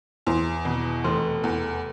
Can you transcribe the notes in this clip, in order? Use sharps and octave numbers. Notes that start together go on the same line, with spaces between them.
E2 E3
B2 D#3
F1 E3
E2